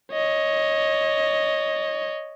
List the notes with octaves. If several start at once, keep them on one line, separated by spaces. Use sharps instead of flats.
C#5 D#5